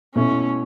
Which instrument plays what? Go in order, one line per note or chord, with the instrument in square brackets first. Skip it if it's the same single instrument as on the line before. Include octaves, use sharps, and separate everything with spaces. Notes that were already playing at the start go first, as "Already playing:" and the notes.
[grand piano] B2 A3 E4 [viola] C#4